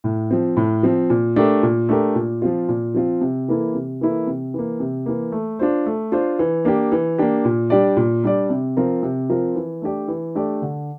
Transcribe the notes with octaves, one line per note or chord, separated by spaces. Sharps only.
A2
F3 C4
A2
F3 C4
A#2
A3 D4 G4 A#4
A#2
A3 D4 G4 A#4
A#2
F3 C4 F4
A#2
F3 C4 F4
C3
E3 A#3 E4 A4
C3
E3 A#3 E4 A4
C3
E3 A#3
C3
E3 A#3
A3
D4 F4 C5
A3
D4 F4 C5
E3
A#3 D4 G4
E3
A#3 D4 G4
A#2
G3 D4 G4 D5
A#2
G3 D4 G4 D5
C3
F3 C4 F4 A#4
C3
F3 C4 F4 A#4
E3
A3 D4 G4 D5
E3
A3 D4 G4 D5
D3